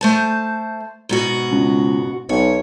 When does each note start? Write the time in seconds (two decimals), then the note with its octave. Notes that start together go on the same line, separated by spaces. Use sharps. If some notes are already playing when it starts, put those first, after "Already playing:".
0.01 A3 C5 A5
1.09 G#2 B2 F#4
1.51 C#2
2.29 B1 C#5